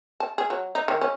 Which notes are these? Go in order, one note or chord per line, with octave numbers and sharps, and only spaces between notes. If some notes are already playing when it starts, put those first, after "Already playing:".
A5
G#4
F#3
D#4
D#3
C#4